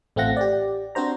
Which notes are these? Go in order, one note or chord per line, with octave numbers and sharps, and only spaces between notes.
A1 A3 C4 F4 F#5 A#6
G4 D5
C4 D4 F#4 C5 A#5